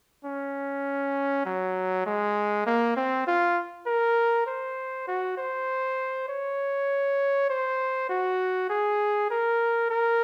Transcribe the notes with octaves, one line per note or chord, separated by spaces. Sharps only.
C#4
F#3
G#3
A#3
C4
F4
A#4
C5
F#4
C5
C#5
C5
F#4
G#4
A#4
A#4